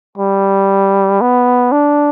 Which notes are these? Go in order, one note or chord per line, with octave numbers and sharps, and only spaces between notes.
G3
B3
D4